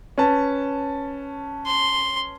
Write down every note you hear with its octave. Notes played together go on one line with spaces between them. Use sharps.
C#4 B4 A5
C6